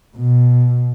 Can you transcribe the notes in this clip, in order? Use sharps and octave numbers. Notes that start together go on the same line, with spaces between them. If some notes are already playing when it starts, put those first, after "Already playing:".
B2